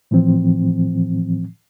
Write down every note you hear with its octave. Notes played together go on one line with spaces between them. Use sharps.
A2 E3 F3 C4